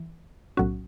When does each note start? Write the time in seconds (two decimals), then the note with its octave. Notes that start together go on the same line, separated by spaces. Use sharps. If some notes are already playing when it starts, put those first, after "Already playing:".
Already playing: E3
0.57 B1 A2 F#3 C#4 F#4